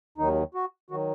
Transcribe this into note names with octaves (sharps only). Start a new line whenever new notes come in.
D#2 D#3 F#3 D#4
F#4
D#3 F#3 F#4